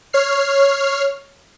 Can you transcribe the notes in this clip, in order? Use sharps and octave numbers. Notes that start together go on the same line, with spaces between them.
C#5 F6 C7